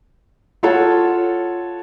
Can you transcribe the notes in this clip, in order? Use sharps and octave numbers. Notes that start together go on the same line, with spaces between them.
F4 A4 C#5 F#5